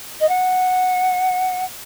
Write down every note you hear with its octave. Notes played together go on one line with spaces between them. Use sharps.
D#5
F#5